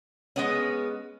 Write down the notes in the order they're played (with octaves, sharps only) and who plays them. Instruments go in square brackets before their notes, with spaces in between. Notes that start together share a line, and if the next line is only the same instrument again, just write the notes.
[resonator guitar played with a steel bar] G#3 B3 C#4